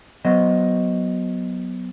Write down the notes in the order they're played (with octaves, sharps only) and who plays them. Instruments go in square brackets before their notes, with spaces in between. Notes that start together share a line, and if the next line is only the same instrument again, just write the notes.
[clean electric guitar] F#3 B3 C5 D#5